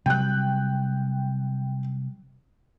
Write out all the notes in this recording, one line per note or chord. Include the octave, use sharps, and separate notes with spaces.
C3 F#3 G3 G5 F#6